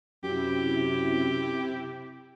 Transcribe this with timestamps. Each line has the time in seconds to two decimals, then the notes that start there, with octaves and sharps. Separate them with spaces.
0.24 F#2 C3 E4 G4